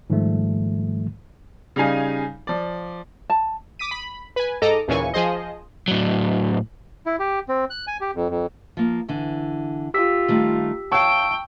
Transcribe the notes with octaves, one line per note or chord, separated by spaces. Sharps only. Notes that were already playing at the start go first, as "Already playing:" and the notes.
G#2 D#3 F3 G3 A3
C#3 G3 D#4 F5 G#5
F3 D5
A5
D6 D#6 B6 D#7
B5
B4 G#5
G#2 A4 D#5 A#5 D6
D#2 A#2 C#3 E3 G#5 C#6
F3 G#4 C5 D#5
A2 F#3
E4
G4
C4
F#6
G#5
G4
F2
F2
F3 A#3
D3 E3
F4 G4 E6 B6
D#3 G3 A3
C#5 F5 G5 A5 C#6 E6